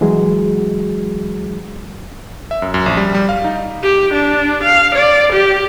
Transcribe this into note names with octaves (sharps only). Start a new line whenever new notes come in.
E3 F#3 G#3 F#4 G#4
E5
F#2
F#2
A#1
G3
G3
F5
D#4
G4
D4
F5
D5
G4